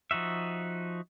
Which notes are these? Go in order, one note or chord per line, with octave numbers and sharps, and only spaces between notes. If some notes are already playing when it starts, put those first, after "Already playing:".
F3 D#4 F#4 E5